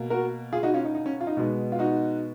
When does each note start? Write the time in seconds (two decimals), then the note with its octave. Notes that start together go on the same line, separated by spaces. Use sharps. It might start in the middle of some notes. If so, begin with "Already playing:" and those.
Already playing: B2 A#3
0.10 F#4 A#4
0.53 F4 G#4
0.63 D#4 F#4
0.74 C#4 F4
0.85 D#4
0.95 D#4
1.06 C#4
1.21 F4
1.27 D#4
1.37 B2 G#3 B3
1.72 F4
1.79 D#4 F#4